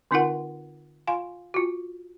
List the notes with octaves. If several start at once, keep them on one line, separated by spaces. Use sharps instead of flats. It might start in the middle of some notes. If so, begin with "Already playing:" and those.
D3 C4 D#4 F4 A#4 F#5
F4 F5 G#5 C6
F4 F#4